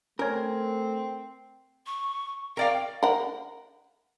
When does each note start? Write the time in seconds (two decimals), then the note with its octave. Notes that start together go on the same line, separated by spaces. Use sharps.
0.19 A3 C4 C#4 A#4 C#5
1.87 C#6
2.57 A#4 D5 F5 G5
3.03 A#4 F#5